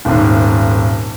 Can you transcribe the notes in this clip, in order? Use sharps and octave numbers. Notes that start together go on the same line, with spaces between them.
D#1 G#1